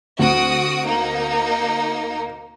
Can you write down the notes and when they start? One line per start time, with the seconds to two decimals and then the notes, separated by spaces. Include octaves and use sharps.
0.19 D2 C4 F#4 D#6 D7
0.86 A#3 D#4